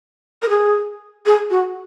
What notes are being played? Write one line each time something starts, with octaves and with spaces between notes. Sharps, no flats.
A#4
G#4
G#4
F#4